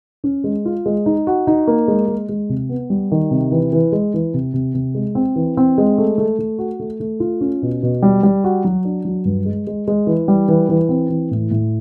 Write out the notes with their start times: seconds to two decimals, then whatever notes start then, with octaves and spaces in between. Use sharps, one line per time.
0.24 C#4
0.44 G#3
0.65 F4
0.86 G#3
1.06 D#4
1.27 F#4
1.47 D#4
1.67 A#3
1.88 G#3
2.08 G#3
2.29 G#3
2.49 C3
2.69 B3
2.90 G3
3.11 D#3
3.31 C3
3.52 E3
3.73 E3
3.92 G#3
4.14 E3
4.34 C3
4.54 C3
4.74 C3
4.95 G#3
5.15 C4
5.36 E3
5.57 C4
5.78 G#3
5.98 A3
6.18 A3
6.39 A3
6.59 F#4
6.80 A3
7.00 A3
7.20 F4
7.41 C#4
7.62 B2
7.83 B2
8.02 G3
8.23 G3
8.44 F#4
8.64 F#3
8.85 D4
9.05 F#3
9.25 G2
9.45 G#3
9.67 G#3
9.88 G#3
10.07 E3
10.28 G3
10.48 E3
10.69 E3
10.89 C4
11.10 E3
11.31 A2
11.51 A2